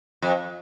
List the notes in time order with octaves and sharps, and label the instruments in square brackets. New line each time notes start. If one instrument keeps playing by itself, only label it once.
[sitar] F2